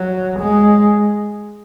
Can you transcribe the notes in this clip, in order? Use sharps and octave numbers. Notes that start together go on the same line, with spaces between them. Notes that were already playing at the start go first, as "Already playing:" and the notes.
Already playing: F#3
G#3